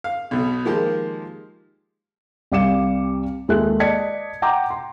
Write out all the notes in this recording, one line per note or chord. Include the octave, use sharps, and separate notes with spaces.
F5
B1 B2
D#3 F3 G#3 A#3 G4
C2 G3 F5 D6 C#7 E7
D#2 G#3 A4 E5 F#6
D5 D#5 A5 G#6 B6 C#7
F#5 G5 A#5 C6 D6
C6